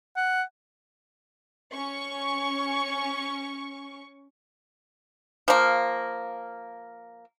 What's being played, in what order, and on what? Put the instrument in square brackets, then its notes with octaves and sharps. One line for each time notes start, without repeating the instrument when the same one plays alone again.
[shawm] F#5
[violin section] C#4 C#6
[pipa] F3 A#3